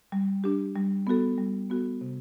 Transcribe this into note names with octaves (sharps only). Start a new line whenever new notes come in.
G3
D4 G4
G3
B3 F#4 A4
G3
B3 F#4 A4
C3